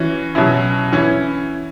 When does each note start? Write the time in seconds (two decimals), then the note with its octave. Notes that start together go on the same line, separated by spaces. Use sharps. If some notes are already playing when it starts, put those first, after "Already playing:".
Already playing: E3 C#4 F#4
0.35 B2 F#3 C#4 E4
0.93 E3 C#4 E4